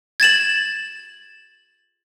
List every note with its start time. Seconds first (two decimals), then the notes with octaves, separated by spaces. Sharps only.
0.20 G#6 A6 E7 F#7